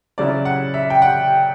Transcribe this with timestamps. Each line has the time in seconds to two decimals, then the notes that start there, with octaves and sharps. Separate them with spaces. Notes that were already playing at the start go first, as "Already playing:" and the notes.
0.18 C#3 F#3 C#4 E4 D5
0.45 F#5
0.74 E5
0.90 G5
1.02 F#5